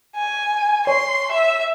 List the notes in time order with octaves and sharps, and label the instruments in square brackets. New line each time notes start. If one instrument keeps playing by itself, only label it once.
[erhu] G#5
[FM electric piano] C#5 [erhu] C6
[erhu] E5